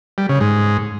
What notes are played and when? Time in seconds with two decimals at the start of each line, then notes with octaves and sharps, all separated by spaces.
0.18 G3
0.29 C#3
0.41 G#2